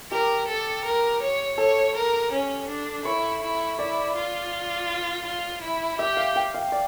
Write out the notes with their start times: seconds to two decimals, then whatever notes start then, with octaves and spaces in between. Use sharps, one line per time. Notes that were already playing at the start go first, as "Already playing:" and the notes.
0.11 G4 A#4
0.48 A4
0.84 A#4
1.22 C#5
1.58 A4 C#5
1.95 A#4
2.32 C#4
2.68 D4
3.05 E4 C#5
3.42 E4
3.79 E4 D5
4.15 F4
5.26 F4
5.62 E4
5.99 G4 E5
6.17 F5
6.36 G5
6.54 F5
6.72 D5